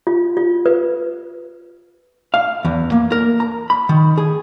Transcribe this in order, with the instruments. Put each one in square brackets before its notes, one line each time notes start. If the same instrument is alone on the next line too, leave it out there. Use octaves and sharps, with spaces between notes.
[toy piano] F4
F4
B4
[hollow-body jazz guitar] F5
E2
A#3
A#4
A#5
B5
D#3
G#4